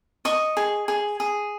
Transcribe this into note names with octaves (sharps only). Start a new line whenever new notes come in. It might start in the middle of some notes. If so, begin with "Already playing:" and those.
D#5 C#6
G#4
G#4
G#4